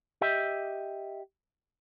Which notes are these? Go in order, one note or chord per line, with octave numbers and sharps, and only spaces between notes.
G4 D#5 E5